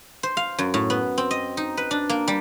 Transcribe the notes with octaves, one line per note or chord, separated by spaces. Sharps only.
C5
F5
F#2
A2
B3
C4
D#5
D#4
B4
D4
A#3
G3